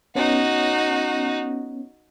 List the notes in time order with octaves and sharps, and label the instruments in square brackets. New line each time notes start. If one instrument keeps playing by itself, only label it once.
[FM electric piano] B3 C#4 [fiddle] D#4 F#4